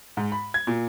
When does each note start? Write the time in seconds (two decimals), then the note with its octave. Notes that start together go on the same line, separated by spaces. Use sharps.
0.17 G#2
0.32 B5
0.54 G#6
0.67 A#2